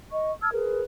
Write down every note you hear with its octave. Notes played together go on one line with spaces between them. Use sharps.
D#5 C#6
A5 E6 F6 G#6
G#4 A#4 B4